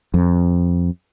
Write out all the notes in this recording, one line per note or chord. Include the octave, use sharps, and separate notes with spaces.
F2